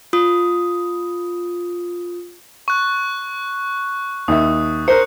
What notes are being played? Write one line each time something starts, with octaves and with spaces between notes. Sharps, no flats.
F4 D#6
C#6 F#6
D#2 E5 D#6
A#4 C5 F#6 C#7